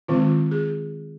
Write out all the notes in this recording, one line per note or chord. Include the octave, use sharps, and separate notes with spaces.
D#3 G#3 C4 F4
G#4